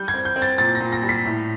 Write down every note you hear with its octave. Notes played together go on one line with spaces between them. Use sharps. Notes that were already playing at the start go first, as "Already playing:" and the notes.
Already playing: G3 G6
G#6
C4
G6
C4
A6
A#2 A6
A#6
A#2
A#6
G3
B6
A2